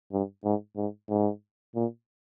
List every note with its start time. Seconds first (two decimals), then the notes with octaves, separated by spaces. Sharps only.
0.12 G2
0.44 G#2
0.76 G#2
1.09 G#2
1.75 A#2